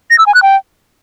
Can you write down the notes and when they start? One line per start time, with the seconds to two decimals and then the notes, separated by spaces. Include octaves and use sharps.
0.10 A#6
0.19 E6
0.27 G#5
0.35 F#6
0.43 G5